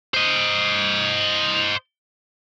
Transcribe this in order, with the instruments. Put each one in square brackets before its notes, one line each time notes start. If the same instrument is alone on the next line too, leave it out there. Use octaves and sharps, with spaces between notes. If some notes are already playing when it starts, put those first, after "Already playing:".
[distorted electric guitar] C5 D#5